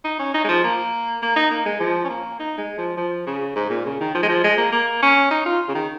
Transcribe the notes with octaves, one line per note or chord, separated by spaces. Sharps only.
D#4
C#4
D#4
G#3
F3
A#3
A#3
D#4
A#3
G#3
F3
C#4
A#3
D#4
G#3
F3
F3
C#3
G#2
A#2
C#3
D#3
F3
G#3
F3
G#3
A#3
A#3
C#4
D#4
F4
C#3
D#3